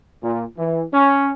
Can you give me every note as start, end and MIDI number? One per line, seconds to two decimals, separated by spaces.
0.21 0.43 46
0.57 0.82 52
0.92 1.30 61